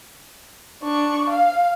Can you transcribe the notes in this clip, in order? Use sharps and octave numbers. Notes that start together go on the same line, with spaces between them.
D4 C#6
F5